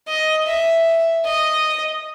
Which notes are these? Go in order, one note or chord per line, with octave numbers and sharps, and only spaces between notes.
D#5
E5
D#5